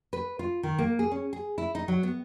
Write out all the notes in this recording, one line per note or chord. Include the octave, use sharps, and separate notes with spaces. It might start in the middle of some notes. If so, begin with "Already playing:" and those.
B4
F4
D#3
A#3
G#4
C#4
G#4
E4
D#4
F#3
B3